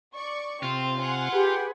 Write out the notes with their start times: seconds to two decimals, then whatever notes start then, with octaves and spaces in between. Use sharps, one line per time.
0.15 D5 C#6
0.63 C3 C4 F4
0.96 F#5 G#5 C6
1.33 G4 G#4 B4